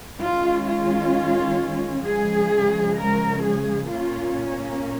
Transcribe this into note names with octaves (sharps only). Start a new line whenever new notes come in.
D#3 G#3 C#4 F4
F4
C#3 F3 G#3 G#4
A#4
G#4
A#2 A#3 C#4 F4